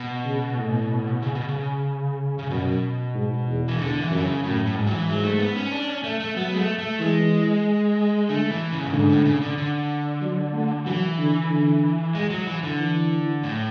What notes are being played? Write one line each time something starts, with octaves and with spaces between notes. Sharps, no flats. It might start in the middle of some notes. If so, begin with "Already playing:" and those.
Already playing: B2
C#3
A2
C#3
B2
C#3
C#3
F#2 B2
G#2
E2
E3
E2 D3
E3
F#2 D3
C#3
F#2 A2
A2
G#2
F#3
E3
G#2 F#3
A3
B3
C#4
D4
C#4
A3
A3
F#3 B3
G#3
A3
A3
E3 G#3
D3 A3
E3
C#3
A2
G#2 D3
A2
C#3
D3
D3
F#3
A3
E3 F#3
D3
D3
G#3
F#3
E3
D3
E3
A2